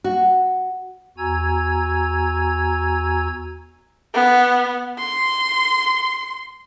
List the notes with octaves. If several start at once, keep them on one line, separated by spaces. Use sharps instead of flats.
F#4
E2 F#4 G#5 A#5 E6 G#6
B3
C6